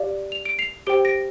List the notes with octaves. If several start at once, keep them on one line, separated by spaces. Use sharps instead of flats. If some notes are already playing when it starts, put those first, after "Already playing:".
Already playing: G4 D5 F5
F7
D7
C7 F7
G4 C5 G5 D7 G7
A#6 D7